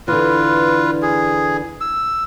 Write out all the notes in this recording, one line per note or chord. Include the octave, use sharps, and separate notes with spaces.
D3 E3 F4 B4
G#4
E6